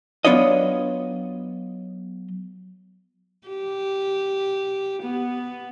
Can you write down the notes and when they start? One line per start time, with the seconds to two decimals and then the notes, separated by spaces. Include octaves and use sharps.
0.25 F#3 B3 D4 F4 C#5 D#5
3.48 G4
5.03 B3